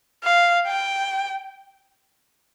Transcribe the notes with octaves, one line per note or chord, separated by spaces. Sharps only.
F5
G5